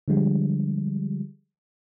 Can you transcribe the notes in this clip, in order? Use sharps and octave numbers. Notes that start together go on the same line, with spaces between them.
D3 F3 G3 G#3